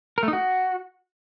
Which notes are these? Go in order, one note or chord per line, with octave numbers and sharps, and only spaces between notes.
A#4
A3
D#4
F#4